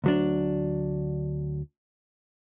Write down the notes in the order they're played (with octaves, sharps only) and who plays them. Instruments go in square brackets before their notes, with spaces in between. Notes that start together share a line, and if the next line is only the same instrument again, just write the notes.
[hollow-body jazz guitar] D2 F#3 D4